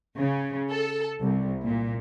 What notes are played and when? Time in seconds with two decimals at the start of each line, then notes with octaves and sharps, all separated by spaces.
0.16 C#3
0.70 A4
1.21 C2
1.64 A#2